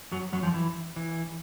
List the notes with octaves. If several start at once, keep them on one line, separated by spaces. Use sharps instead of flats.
F#2 F#3
F#2 F#3
F2 F3
E3
E3